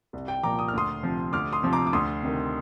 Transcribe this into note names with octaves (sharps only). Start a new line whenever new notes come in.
C2
G5
A#2 F3 A#5 D6
D#6
F6
D2 C6 D#6
C3 F3
D2 D6 F6
C6 D#6
C3 F3
A#5 D6
D6
D2 C6 D#6
C3 D#3